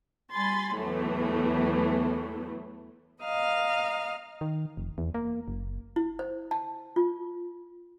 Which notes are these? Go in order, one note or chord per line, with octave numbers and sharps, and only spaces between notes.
G3 G#5 B5 C6 A6
E2 A2 E3 F#3 A3
D#5 F5 A#5 F6
D#3
F1
E2
A#3
F#1
E4
C5
A5
F4